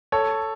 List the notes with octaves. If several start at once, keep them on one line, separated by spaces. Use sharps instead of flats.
A4 C#5